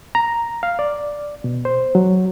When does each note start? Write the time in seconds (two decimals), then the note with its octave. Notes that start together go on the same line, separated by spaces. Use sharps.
0.15 A#5
0.63 F5
0.79 D5
1.44 B2
1.65 C5
1.95 F#3